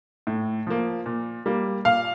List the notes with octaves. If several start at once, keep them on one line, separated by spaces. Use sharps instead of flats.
A2
F3 A#3
A#2
G3 A#3
A#2 F5